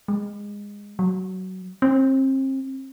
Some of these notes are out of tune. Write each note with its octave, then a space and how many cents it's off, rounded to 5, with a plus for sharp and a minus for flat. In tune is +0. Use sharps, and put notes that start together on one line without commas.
G#3 -20
F#3 +15
C4 +35